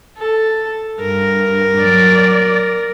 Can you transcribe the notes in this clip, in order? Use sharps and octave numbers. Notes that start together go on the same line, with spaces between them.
A4
G2 A#4
F#3 D5